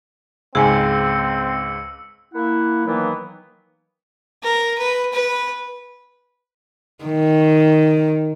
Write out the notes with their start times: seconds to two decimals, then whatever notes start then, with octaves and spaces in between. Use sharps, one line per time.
0.55 C#2 G#2 C4 G#4 G#5 E6 C#7
2.33 A#3 E4 F#5
2.85 D#3 E3 F#3 A#3 B3
4.43 A#4
4.78 B4
5.13 B4
7.04 D#3